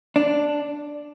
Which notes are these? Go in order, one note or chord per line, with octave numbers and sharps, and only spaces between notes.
D4